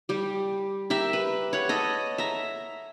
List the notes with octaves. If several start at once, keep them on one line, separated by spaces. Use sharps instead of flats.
G3 G4
G4 A#4 E5
B4
C#5 F#5
A4 D#5
E5 A#5